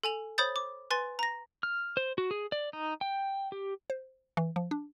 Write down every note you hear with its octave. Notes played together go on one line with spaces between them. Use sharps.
A4 G#5 F7
C5 C#5 B5 D#6 G6 A6
D6
B4 G#5 C6 A6
A#5 A#6
F6
C5
F#4
G#4
D5
D#4
G5
G4
C5
E3
F3
D4